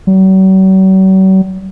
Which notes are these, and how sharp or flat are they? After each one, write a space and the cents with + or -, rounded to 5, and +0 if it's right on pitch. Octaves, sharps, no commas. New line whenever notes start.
F#3 +45